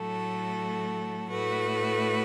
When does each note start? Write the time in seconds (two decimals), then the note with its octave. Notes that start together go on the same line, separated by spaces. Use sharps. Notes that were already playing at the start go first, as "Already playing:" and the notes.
Already playing: A2 F#3 A3 F#4 A4
1.30 A2 A3 F#4 B4